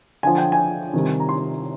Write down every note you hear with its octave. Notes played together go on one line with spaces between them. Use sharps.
D3 F3 G#5
G5
G#5
C3 D#3 G3
A#5
C6